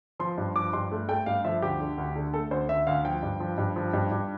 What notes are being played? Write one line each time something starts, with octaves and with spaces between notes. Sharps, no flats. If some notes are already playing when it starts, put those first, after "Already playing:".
F3 C6
G2
F3 D6
G2 C6
A3
A3 G5
G2 F5
F3 E5
D2 G4
D3
D2
D3
A3 A4
D2 C5
D2 E5
D2 F5
F3 G5
G2
F3
G2
F3
G2
G2